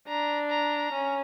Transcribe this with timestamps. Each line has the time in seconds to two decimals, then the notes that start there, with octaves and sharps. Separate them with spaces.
0.08 D4 A#5
0.49 A#5
0.92 C#4